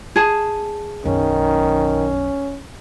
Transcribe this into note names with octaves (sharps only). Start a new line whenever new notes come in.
G#4 A5
B1 F#2 D#3 C#4